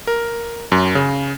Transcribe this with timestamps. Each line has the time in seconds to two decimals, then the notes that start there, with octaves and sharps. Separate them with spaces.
0.07 A#4
0.72 F#2
0.95 C#3